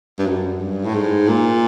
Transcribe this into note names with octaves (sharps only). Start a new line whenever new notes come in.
G2
F#2
G2
A2
G#2
A#2